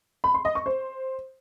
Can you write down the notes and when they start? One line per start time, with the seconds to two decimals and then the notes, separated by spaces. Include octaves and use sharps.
0.24 B5
0.34 C6
0.45 D#5
0.55 C#6
0.66 C5